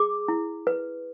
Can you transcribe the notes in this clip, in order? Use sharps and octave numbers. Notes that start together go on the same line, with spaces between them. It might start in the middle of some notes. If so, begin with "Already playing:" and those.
Already playing: G#4 D6
E4
B4